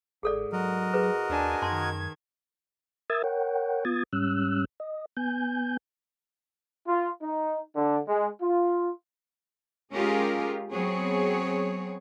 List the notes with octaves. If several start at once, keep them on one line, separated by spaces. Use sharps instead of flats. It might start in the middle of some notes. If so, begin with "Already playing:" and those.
G1 G#2 G#4 A4 D5
F#3 F#4 A#4 D#5
G#4 B4
D#2 D4 G#5 A5
F#2 D#3 A5 C6 G#6
A#4 E5 D#6 E6 G#6 A6
A#4 C#5 F#5 G5
B3 F4 D#6 G#6 A6
G#2 G3 C#4 E6 F#6
D#5
B3 G#5 G6
F4
D#4
D3
G#3
F4
G#3 C#4 F4 G4 G#4 A#4
F#3 B3 C4 G#4 C#5